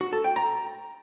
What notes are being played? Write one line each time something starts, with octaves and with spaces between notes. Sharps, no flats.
F#4
A4
G5
A#5